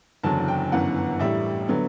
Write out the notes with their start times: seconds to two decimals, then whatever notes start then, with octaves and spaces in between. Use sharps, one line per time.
0.23 F#1 E2 D3 F#3 A5
0.48 G5
0.72 G1 F#2 E3 B3 F#5
1.20 A1 A2 G3 E5
1.68 D3 F#3 B3